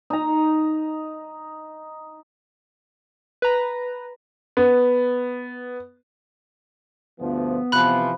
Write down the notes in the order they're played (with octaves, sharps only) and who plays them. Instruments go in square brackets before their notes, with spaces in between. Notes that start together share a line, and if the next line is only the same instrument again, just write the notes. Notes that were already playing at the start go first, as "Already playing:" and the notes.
[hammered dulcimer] D#4 A#5
[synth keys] B4 A#5
[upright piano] B3
[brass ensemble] D2 G2 F3 [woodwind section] B3
[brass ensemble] C3 E3 F3 [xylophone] B5 F#6